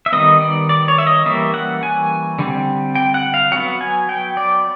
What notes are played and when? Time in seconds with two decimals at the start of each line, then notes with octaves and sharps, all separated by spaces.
0.06 E5
0.12 D#3 G3 B3 D#5
0.41 D5
0.69 D5
0.88 C#5
0.98 E5
1.07 D#5
1.26 E3 G3 A#3 C#4 E5
1.54 F#5
1.83 G#5
2.39 D3 G3 C4
2.95 G5
3.14 F#5
3.34 F5
3.52 F#3 B3 F#5
3.81 G#5
4.09 G5
4.37 D5